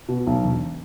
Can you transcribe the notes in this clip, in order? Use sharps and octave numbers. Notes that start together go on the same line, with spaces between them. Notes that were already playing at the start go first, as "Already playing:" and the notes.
B2
B1
E1